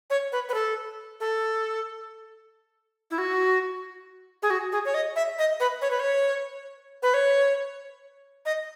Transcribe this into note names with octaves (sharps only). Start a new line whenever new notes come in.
C#5
B4
B4
A4
A4
E4
F#4
G#4
F#4
G#4
C#5
D#5
E5
D#5
B4
C#5
B4
C#5
B4
C#5
D#5